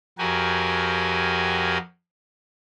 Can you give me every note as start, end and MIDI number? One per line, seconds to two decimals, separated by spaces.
0.19 1.78 41
0.19 1.78 66
0.19 1.78 67
0.19 1.78 70
0.19 1.78 80